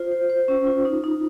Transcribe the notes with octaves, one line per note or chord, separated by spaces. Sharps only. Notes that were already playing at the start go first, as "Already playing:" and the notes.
Already playing: F4 C5
C5
C5
C#4
F4
D#4
D#4